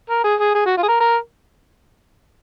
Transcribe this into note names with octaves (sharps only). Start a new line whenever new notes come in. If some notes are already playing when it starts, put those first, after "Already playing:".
A#4
G#4
G#4
G#4
F#4
F4
G#4
A#4
A#4